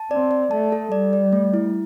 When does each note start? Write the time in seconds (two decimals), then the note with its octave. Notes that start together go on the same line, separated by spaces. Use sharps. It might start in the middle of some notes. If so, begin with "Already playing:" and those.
Already playing: A5
0.11 C4 D5
0.31 D5
0.51 A3 A5
0.72 A4
0.92 G3 D5
1.13 D5
1.33 A3
1.54 E4